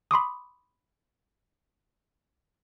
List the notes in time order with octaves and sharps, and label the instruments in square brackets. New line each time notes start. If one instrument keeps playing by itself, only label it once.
[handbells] B5 C6 D6 D#6